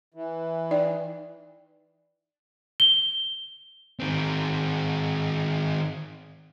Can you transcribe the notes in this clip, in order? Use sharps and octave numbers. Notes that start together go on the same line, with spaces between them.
E3
D#4 D5 G5
G7
D#3 C4